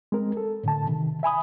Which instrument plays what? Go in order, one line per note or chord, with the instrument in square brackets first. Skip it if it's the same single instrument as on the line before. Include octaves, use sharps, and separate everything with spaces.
[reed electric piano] G#3 C4 A#4
A4
A2 D3 A5
C3 D#3
E5 G#5 B5 D#6